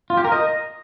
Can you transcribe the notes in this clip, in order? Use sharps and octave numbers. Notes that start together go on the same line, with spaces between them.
F4
G4
A#4
D#5